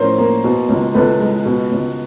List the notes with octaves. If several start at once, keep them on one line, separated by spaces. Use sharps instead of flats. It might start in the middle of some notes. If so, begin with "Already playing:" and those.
Already playing: A2 F3 C#4 A#4 C5
A#3
B2
C#2
C#2 A4 B4
G#3
B2
C#2